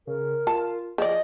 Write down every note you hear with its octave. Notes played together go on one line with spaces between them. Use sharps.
C#3 A#4
F4 A5
F3 G#4 D5 D#5